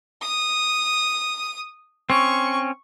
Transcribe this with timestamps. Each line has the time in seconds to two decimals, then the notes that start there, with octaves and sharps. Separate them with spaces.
0.21 D#6
2.10 C4 C#4 C#6